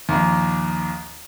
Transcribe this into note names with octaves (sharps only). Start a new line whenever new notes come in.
A#1 D#2